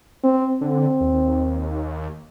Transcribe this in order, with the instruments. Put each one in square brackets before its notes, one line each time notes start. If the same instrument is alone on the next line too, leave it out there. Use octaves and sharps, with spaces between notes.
[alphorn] C4
[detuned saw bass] D3 [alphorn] C4
[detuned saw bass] D#2